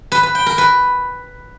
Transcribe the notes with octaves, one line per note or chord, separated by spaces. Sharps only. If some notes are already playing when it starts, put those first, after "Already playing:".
B4
B4
G5
A#4
B4